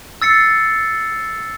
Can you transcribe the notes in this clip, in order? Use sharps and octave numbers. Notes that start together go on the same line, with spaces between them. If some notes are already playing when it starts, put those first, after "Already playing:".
E6 A6 C7 C#7